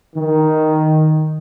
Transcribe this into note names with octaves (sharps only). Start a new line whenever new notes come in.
D#3